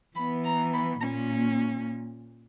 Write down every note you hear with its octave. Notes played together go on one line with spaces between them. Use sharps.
E3 B3 B5
A#5
B5
A#2 A#3 C#4 A#5